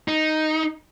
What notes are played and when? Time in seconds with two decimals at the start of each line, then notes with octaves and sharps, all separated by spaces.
0.08 D#4